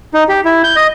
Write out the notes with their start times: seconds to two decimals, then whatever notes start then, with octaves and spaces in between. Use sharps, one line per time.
0.14 D#4
0.29 G4
0.45 E4
0.64 G6
0.76 D#5